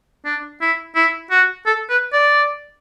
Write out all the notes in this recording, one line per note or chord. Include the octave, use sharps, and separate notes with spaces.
D4
E4
E4
F#4
A4
B4
D5